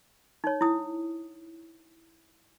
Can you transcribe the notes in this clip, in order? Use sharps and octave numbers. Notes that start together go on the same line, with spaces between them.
D#4 C#5
E4 D#6